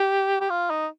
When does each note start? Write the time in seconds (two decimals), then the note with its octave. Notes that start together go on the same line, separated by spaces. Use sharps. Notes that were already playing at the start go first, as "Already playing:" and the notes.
Already playing: G4
0.40 G4
0.50 F4
0.70 D#4